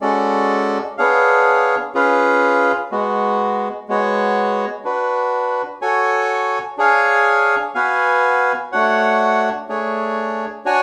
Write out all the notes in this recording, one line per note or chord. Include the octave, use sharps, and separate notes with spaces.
G#3 C#4 F#4 A4 D5
B3 D4 G#4 C#5 F5
C#4 F4 G#4 B4 F5
G#3 B3 F#4
G#3 B3 F#4 C#5
D4 F#4 B4
F#4 A4 C#5 G#5
D4 G#4 C#5 F5 G#5
B3 F#4 B4 F5 G#5
A3 D4 F#4 C#5 F#5
A3 D4 G#4 C#5
D4 F#4 C#5 G#5